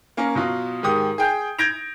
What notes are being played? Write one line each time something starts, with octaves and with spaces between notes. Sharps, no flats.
A#3 C#4 A#4
B2 F#3 F4
G#2 D#3 G4 D#6
G#4 G5 G6
G6 G#6 A#6 D7 F7